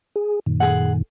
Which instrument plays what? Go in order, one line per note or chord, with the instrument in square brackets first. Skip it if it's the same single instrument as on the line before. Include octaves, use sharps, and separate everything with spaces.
[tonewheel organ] G#4
F#2 A#2 D#3
[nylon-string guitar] G#4 F#5